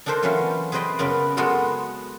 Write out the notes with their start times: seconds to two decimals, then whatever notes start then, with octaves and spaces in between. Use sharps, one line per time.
0.06 D4 D#4 A4 A#4 C5
0.23 E3 F#3 A#3 C#4 F4
0.72 G#4 B4 C5 D5 D#5 G5
0.99 F#2 C#3 B3 A#4 B4 D5
1.37 G#3 B3 F#4 A4 A#4 C5